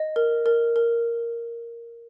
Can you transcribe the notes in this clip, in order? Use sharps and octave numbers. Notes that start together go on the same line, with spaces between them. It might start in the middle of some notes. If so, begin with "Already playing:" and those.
Already playing: D#5
A#4
A#4
A#4